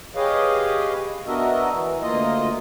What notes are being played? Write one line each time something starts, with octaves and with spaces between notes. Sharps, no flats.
G4 G#4 B4 C#5 D#5 F5
B3 D4 F#4 A#4 D#5 E5
E3
D2 A#3 F4 D#5